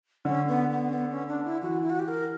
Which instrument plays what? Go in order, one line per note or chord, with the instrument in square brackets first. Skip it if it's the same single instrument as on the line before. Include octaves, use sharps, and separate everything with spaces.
[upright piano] D3 [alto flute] C#4
[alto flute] B3
B3
C#4
B3
C#4
D4
E4
[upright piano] E3 [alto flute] F#4
[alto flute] E4
F#4
G4
A#4